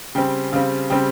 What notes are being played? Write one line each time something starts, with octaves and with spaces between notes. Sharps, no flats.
C#3 G3 C4 G5
C#3 G3 C4 F5
C#3 G3 C4 G5